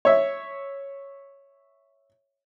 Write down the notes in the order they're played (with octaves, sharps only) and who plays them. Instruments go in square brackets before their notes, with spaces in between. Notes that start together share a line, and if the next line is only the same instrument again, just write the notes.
[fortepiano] C#5 E5